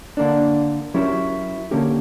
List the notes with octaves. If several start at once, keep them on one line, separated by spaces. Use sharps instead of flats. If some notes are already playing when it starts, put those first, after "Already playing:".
D3 A#3 D4
F#3 C#4 E4 G4 A#4
D3 A#3 C#4 G4 A#4